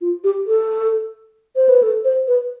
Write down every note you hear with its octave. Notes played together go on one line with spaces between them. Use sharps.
F4
G4
A4
C5
B4
A4
C5
B4